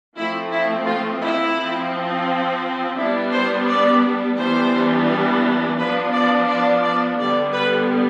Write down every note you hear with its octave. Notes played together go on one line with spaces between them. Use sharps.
F3 A3 C4 E4
E4
F4
E4
F3 C4
G3 B3 D4 E4
C5
D5
E3 G3 B3 D4 C5
F3 B3 D4 B4
D5
D5
D5
D3 G3 B3 D5
B4